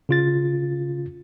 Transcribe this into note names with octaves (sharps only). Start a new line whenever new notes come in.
C#3 F4 A6